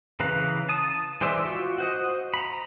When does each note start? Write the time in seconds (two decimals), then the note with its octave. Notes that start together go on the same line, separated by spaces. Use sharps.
0.20 C#3 E3 B4 F5 A#5
0.69 A5 D#6
1.21 E3 G#3 C5 D5 E5
1.45 F4 F#4
1.78 F#4 C5 D#5
2.34 A#5 B5